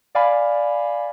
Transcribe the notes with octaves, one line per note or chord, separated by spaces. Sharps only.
D5 F5 G#5 B5